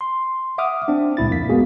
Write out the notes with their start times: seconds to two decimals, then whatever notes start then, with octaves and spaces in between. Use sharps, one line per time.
0.01 C6
0.58 E5 F#5 D6 D#6 F6
0.88 C4 D4
1.17 C#2 A#2 E4 A6
1.30 F2 A#3 B6
1.49 G#3 A#3 B3 F#4 G#4